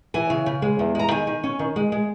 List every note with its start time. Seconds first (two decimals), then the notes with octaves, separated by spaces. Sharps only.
0.14 E3 G#5
0.30 C#3
0.46 C#3
0.62 G#3
0.79 E2
0.95 G#3 A#5
1.11 D#3 G#5
1.27 D#3
1.44 C#4
1.59 D#3
1.76 G#3
1.92 G#3